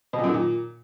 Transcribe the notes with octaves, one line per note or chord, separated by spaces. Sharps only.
B2
A#2
F#2
D#3
A#2